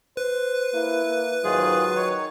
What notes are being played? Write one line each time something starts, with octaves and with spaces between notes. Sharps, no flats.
B4 C5
A#3 E4
A#3
G#2 D#3 F#3 F4 G#4
D#3 C#5